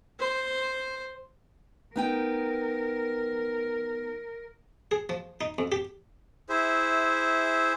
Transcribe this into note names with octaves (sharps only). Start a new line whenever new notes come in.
C5
B3 D#4 A#4 G5
G#4
F3
D#4
F2
G4
E4 G#4 C5 E5